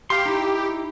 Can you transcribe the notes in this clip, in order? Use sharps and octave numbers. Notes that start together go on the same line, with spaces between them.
G4 F5 C6
D#4 E4